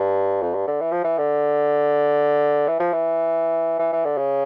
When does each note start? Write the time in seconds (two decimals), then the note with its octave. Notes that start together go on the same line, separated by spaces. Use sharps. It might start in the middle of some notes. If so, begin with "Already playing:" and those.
Already playing: G2
0.42 F2
0.54 G2
0.67 D3
0.80 E3
0.92 F3
1.04 E3
1.18 D3
2.68 E3
2.80 F3
2.93 E3
3.79 E3
3.93 E3
4.05 D3
4.18 C#3